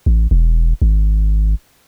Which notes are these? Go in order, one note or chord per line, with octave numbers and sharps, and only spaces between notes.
A1
E1
G#1